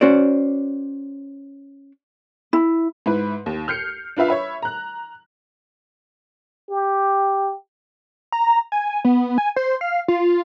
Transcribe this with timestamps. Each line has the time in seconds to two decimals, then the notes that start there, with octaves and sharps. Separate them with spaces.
0.01 C#4 F#4 C5 D5
2.53 E4
3.06 G#2 E4 B4
3.46 D#2
3.68 F6 G6 C7 C#7
4.17 D4 F4 B4 E5 F5
4.28 C#5 E5 B5
4.62 A#5 F#6
6.70 G4
8.32 A#5
8.72 G#5
9.05 B3
9.38 G#5
9.56 C5
9.81 F5
10.08 F4